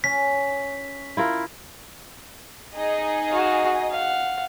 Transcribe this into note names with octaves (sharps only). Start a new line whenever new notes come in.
C#4 B6
E4 F4 A#4
D#4 G#4 D#5
F#4 F5
F5 F#5